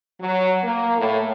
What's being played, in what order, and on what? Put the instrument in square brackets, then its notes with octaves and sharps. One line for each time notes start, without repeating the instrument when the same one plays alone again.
[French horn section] F#3
A#3
A2